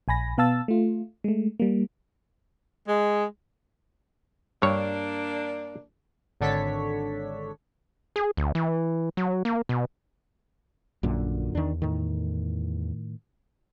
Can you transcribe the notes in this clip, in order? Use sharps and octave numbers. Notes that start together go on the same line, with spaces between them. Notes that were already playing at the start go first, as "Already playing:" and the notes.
A#1 G#5 B5 A#6
B2 B3 F5 A5 E6 A6
A3 F4
G#3 A3
G3 A#3
G#3
G2 A#3 D4 C#5
G#1 D3 D4 A4 C#5 B6
G#4
D2
E3
F#3
A#3
B2
A#1 F#2 A#2 D3
E2 D#3 D4
A2 D#3